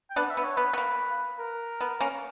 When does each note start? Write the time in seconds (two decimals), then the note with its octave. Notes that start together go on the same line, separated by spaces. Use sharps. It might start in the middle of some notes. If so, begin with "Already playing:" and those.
0.10 G5
0.16 B3 D4 F#5
0.30 E5
0.37 B3
0.43 C#5
0.57 B3 B4
0.73 B3
0.78 A#3
1.39 A#4
1.81 B3
2.01 A#3 C#4